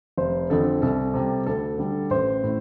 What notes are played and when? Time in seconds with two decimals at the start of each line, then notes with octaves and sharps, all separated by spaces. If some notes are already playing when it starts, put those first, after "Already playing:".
0.17 F1 C5
0.50 F2 D3 A4
0.82 C2 A4
1.14 C3
1.19 G3
1.46 D2 A4
1.78 D3 G3
2.10 A1 C5
2.44 A2